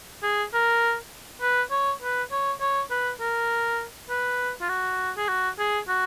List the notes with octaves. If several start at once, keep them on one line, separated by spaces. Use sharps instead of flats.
G#4
A#4
B4
C#5
B4
C#5
C#5
B4
A#4
B4
F4
F#4
G#4
F#4
G#4
F#4